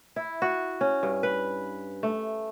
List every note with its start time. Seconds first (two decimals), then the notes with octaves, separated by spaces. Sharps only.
0.16 E4
0.42 F#4
0.81 C#4
1.03 G2
1.23 B4
2.03 A3